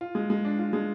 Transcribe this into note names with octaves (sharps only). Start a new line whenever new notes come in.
F4
G#3
G#3
D4
F4
G#3